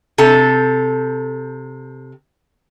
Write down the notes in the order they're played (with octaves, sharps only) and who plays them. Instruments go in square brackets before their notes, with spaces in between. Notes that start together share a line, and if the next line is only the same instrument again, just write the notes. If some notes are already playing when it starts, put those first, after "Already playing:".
[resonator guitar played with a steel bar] C3 A4